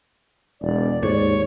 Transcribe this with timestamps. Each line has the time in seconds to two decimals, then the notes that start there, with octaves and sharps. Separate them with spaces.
0.61 E1 D5
1.03 D#2 G#2 C#5